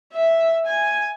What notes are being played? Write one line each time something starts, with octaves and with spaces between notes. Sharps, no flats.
E5
G#5